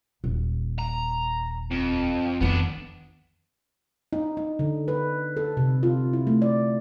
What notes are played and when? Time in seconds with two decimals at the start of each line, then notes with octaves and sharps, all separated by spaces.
0.24 D#1
0.78 A#5
1.71 F2
2.41 F2 D#3 B3 D4
4.13 D#4
4.37 D#4
4.59 D3
4.88 B4
5.37 A4
5.57 C3
5.83 F4
6.13 E4
6.27 A3
6.42 D5